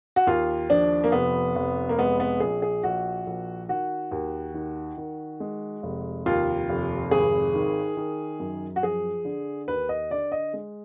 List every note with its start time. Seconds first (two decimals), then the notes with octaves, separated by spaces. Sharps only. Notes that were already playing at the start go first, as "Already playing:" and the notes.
0.16 F#4
0.27 D#2 F4
0.70 F3 D4
1.04 A#3
1.12 F1 B3
1.56 F1
1.89 A#3
1.98 G#3 B3
2.20 B3
2.40 A#1 G#4
2.62 G#4
2.84 A#1 F#4
3.27 A#1
3.69 D#3 F#4
4.12 D#2
4.54 D#3
4.97 D#3
5.40 G#3
5.83 F1
6.26 D#2 F4
6.69 F1
7.11 G#1 G#4
7.54 D#3
7.97 D#3
8.40 F#2
8.76 F#4
8.83 F3 G#4
9.25 D3
9.68 D#2 B4
9.89 D#5
10.11 D3 D5
10.32 D#5
10.53 G#3